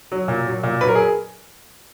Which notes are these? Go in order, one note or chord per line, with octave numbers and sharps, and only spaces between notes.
F#3
A#2
F#3
A#2
F#3 B4
A#4
G#4